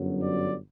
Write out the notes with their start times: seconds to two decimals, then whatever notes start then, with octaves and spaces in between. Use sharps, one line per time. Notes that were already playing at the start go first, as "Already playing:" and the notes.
Already playing: G1 F#2 F#3
0.19 D5